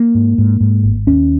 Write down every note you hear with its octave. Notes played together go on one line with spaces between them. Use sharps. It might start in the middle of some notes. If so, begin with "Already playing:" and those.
Already playing: A#3
G#2
G#2
G#2
G#1
D#2 C#4